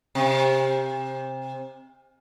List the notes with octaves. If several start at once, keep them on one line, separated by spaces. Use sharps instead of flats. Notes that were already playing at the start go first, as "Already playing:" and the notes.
C3